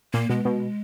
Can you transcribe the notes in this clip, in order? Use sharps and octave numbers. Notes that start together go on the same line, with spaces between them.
A#2 A#3
B2 G#3
B2